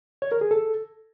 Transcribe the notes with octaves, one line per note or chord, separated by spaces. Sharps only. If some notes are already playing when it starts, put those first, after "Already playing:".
C#5
A#4
G#4
A4